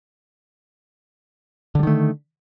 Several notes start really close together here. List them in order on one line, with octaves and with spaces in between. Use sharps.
D3 G3 D#3 A3